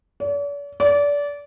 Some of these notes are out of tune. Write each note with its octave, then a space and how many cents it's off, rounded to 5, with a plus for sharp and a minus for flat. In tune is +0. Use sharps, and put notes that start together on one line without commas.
D5 -45
D5 -25